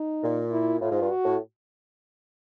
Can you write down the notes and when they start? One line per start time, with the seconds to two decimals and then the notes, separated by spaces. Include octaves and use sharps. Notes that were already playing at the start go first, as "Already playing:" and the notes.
Already playing: D#4
0.23 A#2
0.51 E4
0.81 A2 F4
0.91 G#2
1.00 G2
1.10 F#4
1.25 A2